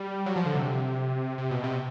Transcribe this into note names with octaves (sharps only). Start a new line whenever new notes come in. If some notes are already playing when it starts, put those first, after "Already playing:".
Already playing: G3
F#3
F3
D3
C3
C3
B2
C3